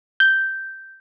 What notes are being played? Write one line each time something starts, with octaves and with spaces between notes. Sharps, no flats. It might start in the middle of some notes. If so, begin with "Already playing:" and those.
G6